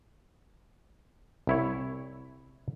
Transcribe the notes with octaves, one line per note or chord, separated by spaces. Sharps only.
C2 E4 C#5